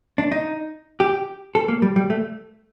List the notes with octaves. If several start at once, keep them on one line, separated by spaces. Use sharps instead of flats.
D4
D#4
G4
A4
A#3
G3
G3
A3